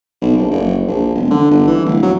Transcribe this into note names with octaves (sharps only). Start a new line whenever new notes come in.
B1
A#1
F#1
A#1
E1
D3
G1
E3
D1
F#3